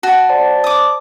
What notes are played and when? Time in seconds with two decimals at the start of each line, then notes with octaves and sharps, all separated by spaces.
0.03 F#4 A5
0.29 C5 D5 A5
0.64 D6 D#6